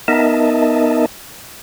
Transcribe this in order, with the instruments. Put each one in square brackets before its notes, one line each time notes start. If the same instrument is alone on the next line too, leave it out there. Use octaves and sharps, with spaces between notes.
[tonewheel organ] B3 D#4 A#4 D#5 E5 A5